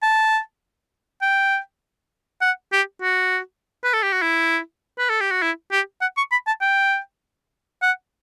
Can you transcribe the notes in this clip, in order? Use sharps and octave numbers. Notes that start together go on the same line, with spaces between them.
A5
G5
F#5
G4
F#4
B4
A4
G4
F#4
E4
B4
A4
G4
F#4
E4
G4
F#5
C#6
B5
A5
G5
F#5